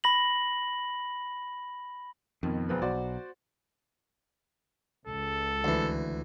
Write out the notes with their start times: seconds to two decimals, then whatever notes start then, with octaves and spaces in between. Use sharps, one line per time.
0.04 B5 A#6 F#7
2.43 F2 B2 D#3
2.69 E1 F3 B4
2.82 B1 F#4 C5 D5
5.07 C#2 A4
5.64 D2 E3